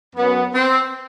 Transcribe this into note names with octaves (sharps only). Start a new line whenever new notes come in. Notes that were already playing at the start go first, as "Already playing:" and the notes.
F#2 F#3 B3
C4